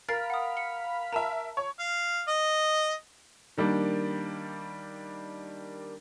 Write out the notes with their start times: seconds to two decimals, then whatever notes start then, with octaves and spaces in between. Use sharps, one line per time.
0.09 A#4 F5 B5 A6 C7
0.30 F#5 D#6
0.57 C#7
1.13 A#4 E5 A5 A#5
1.57 C#5
1.79 F5
2.28 D#5
3.57 D#3 G3 A#3 D4